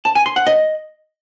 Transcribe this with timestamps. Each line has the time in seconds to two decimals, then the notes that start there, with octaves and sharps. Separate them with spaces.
0.05 A5
0.15 G#5
0.26 C6
0.36 F#5
0.47 D#5